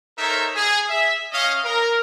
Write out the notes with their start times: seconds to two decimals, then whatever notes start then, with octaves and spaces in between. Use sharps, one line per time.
0.18 D#4 A4 A#4 C5 C#5 E5
0.55 G#4
0.89 E5
1.32 C#4 D#5 F5
1.63 A#4